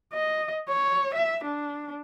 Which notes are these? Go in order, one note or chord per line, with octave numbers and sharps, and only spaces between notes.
D#5
C#5
E5
D4